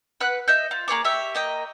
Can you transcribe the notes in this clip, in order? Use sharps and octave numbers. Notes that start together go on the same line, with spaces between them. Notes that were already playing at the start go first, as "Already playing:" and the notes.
B4 F#5 F#6
D#5 E5 G6
F4
A#3 G#4 C#5 D6
G4 C#5 E5
A#3 D#5 G5